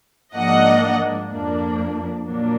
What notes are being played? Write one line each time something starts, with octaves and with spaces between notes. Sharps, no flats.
G#2 F3 A#3 D4 D#5 F#5
F2 F3 A#3 D4
A#2 F#3 A#3 D4